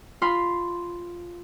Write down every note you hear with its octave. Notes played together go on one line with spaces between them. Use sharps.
F4 F5 B5 C6